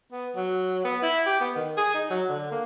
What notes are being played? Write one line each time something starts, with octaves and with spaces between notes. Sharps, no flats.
B3
F#3
B3
E4
G4
B3
D#3
G#4
D#4
F#3
D3
A#3